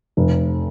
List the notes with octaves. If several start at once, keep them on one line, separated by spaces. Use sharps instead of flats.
F1